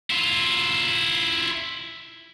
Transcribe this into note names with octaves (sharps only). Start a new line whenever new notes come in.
E4 F4